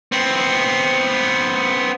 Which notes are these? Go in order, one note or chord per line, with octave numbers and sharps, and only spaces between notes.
B3 C4